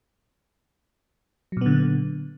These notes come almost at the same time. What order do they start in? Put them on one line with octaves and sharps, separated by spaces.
F#3 A#2 B3 D3